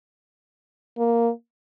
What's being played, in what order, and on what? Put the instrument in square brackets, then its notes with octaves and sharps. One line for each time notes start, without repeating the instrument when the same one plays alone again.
[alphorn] A#3